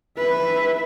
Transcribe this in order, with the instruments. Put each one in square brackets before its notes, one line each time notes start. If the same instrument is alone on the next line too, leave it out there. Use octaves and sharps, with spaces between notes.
[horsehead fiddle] B4 E5